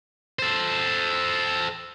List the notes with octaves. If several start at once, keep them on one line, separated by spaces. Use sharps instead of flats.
A4 C5